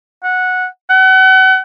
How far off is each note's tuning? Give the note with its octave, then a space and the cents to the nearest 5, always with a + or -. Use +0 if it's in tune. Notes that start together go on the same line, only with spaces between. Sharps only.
F#5 -10
F#5 +35